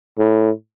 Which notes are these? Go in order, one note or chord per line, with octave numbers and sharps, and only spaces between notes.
A2